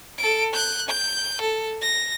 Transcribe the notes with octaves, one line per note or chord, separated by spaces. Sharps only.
A4 D7
F#6 G6
G6
A4
A#6